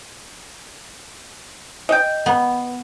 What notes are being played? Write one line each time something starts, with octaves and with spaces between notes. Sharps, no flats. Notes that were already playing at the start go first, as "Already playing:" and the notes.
D#5 G5
B3